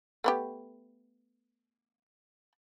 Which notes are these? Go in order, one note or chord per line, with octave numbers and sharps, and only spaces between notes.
A3 B3 G4